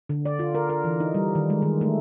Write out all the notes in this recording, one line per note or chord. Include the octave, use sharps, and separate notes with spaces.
D3
D5
F4
A#4
A#4
E3
D#4
G3
D#3
G#3
D#3
A3